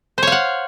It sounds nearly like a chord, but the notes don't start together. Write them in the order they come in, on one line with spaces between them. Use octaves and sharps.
C5 C#5 F5 F#5